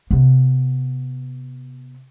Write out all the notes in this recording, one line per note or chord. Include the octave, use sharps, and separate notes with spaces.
C3 B3